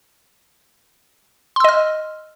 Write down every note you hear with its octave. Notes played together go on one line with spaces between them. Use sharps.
D#5 C6 E6 F6